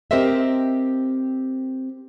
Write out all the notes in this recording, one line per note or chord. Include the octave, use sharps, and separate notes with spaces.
C4 G4 A#4 C5 D#5 E5